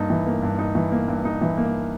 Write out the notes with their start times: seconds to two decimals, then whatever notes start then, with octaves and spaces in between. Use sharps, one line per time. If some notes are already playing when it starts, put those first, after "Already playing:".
Already playing: G2 A#3 D#4
0.10 E3
0.26 A#3
0.42 G2
0.59 D#4
0.75 E3
0.91 A#3
1.08 G2
1.25 D#4
1.41 E3
1.57 A#3